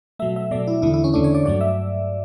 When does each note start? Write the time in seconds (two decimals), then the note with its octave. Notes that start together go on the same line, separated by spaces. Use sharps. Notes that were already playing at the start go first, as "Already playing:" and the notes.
0.19 B2 F#3 A3 E5
0.36 E5
0.51 B2 F#3 A3 D5
0.67 E4
0.82 E2 D3 A3 E4
0.94 E4
1.04 C#4
1.14 E2 D3 A3 D4
1.24 C#5
1.34 D5
1.45 G2 F#3 A3 D5
1.61 E5